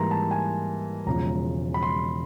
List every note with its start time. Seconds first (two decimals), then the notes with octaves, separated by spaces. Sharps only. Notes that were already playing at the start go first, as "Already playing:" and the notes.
Already playing: G#2 E3 G3 A#3 A#5 C6
0.11 A5
0.31 G#5
1.06 E1 E2 C#3 F3 G#3 A#5
1.74 B5
1.83 C6